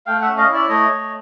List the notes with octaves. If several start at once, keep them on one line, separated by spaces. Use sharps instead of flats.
A3 F5 G5
E5 F#5
C#4
D#5 F5
E4
D5 E5
A3 C#5 D#5
A3